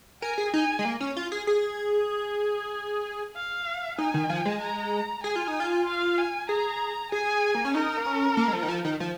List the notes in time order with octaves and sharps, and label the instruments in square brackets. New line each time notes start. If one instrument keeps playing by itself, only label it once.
[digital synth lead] A#4 [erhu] G#5
[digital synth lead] G#4
[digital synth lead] D#4 [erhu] G#5
[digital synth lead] G#3
A#3
C#4
F4
G#4
G#4
[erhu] F5
[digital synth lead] D#4 [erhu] G#5
[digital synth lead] D#3
F3
G#3
[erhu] A#5
[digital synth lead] G#4 [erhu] G#5
[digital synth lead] F4
D#4
F4
[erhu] F5
G#5
[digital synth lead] G#4 [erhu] A#5
[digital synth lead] G#4 [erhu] G#5
[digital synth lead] A#3
C#4
[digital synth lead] D#4 [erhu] A#4
[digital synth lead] A#3
C#4
A#3
G#3
F3
D#3
F3
D#3
F3